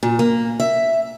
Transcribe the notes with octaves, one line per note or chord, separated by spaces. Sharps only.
A#2
A#3
E5